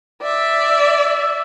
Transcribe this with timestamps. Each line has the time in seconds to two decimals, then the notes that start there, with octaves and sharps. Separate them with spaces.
0.22 D5 E5